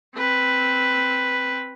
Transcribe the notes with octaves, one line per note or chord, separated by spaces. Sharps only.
C4 B4